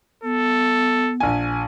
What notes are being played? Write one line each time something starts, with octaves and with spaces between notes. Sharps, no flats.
B3 A4
A#1 G#5